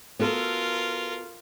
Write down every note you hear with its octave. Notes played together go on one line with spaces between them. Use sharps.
B3 F4 F#4 A4 A#4